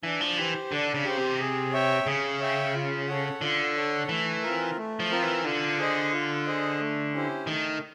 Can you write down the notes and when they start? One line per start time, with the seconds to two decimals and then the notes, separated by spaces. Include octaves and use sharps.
0.03 E3 D4
0.21 F3
0.38 E3 G4 C5
0.71 D3 D4
0.94 C#3
1.05 G4 C5
1.17 C3
1.40 G#4
1.72 C#5 E5 G5
2.06 C#3 G#4
2.40 C#5 E5 G5
2.75 F4
3.08 A4 C#5 F#5
3.41 D3 F4
3.76 A4 C#5 F#5
4.09 E3 A3
4.43 C4 F4 A#4
4.77 A3
5.00 F3
5.11 C4 F4 A#4
5.22 E3
5.44 D3 F4
5.78 G#4 C5 D#5
6.13 F4
6.47 G#4 C5 D#5
6.79 A3
7.13 C#4 E4 G4 C5
7.47 D#3 A3